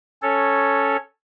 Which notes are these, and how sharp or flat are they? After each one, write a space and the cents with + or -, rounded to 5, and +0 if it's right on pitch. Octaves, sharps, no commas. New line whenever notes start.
C#4 +0 A4 +0 C#5 +0